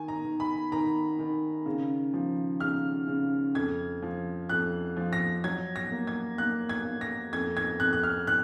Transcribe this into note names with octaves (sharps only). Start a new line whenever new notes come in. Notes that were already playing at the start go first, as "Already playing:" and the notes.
Already playing: D#3 G#5
A#5
D#3
B5
D#3 A#5
D#3
C#3
F3
C#3 F6
C#3
F2 G#6
F3
F2 F#6
F3
A#6
F#3 G#6
A#6
A#3
G#6
A#3 F#6
G#6
A#3
A#6
F2 G#6
G#6
F2 F#6
F#6
F6
F#6